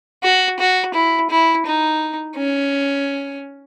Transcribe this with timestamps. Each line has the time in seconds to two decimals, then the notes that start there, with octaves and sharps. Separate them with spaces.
0.23 F#4
0.59 F#4
0.94 E4
1.30 E4
1.66 D#4
2.37 C#4